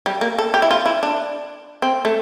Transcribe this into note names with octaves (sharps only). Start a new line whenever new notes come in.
G3
A#3
A4
G4
E4
F4
E4
D4
C4
A3